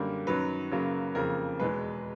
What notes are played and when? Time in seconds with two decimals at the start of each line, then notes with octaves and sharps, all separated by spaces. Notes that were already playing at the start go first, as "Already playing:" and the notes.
Already playing: F#2 D3 G3 A#3
0.27 F#2 D#3 F#3 B4
0.71 F#2 C#3 F#3 A#3
1.15 F2 C#3 F3 A#3 A#4
1.60 E2 B2 G#3 B4